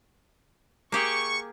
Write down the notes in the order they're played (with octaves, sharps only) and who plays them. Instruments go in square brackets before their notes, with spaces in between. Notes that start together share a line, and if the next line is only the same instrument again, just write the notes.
[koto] A#3 G4 G#4 [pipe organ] C#6